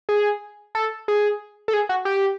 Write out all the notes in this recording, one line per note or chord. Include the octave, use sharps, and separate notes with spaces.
G#4
A4
G#4
A4
G#4
F#4
G4